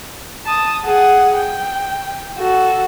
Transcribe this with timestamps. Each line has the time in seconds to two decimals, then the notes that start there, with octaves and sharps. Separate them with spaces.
0.46 A5 D#6
0.85 G#4 F#5
1.36 G5
2.39 F#4 A4